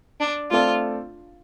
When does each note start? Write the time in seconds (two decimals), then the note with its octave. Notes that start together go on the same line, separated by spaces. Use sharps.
0.20 D4
0.51 A3 C4 F4 A4 D5